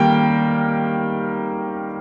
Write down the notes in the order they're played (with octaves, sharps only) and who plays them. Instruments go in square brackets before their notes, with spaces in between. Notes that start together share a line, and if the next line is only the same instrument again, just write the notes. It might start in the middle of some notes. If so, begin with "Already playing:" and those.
Already playing: [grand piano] D#3 G3 A#3 G5